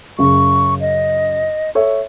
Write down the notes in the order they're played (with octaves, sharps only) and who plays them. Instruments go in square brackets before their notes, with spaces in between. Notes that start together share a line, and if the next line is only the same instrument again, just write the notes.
[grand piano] F#2 C#3 [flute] C#6
[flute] D#5
[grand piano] A4 C#5 E5